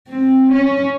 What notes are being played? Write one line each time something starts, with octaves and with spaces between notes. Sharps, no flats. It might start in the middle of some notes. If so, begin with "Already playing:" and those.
C4
C#4